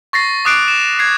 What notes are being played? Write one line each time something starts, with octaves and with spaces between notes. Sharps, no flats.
C#6 A6 A#6 C7
D6 D#6 F#6 C7 D7
E7
G#6 C7